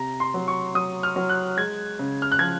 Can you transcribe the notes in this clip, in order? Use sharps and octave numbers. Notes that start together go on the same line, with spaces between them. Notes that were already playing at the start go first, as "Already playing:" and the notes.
Already playing: C3 A#5
C6
F#3
C#6
F#3 D#6
F6
F#3
F#6
G#3 G#6
C#3
F6
F#6
F3 G#6